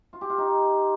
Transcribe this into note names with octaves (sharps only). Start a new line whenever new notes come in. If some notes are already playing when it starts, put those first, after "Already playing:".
F4
G4
F4
D#4